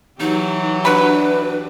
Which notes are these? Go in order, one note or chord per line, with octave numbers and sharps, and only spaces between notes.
E3 F#3 D#4 G4
D4 F#4 B4 B5